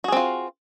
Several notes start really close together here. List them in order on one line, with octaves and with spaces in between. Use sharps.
F#4 G#4 C4 F4